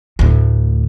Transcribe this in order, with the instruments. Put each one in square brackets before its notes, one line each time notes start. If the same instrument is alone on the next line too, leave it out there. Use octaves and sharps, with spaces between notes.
[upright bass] D2 A2